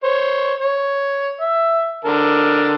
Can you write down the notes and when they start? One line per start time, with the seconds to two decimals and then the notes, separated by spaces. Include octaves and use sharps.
0.04 C5 C#5
0.60 C#5
1.40 E5
2.05 D3 A#4 A5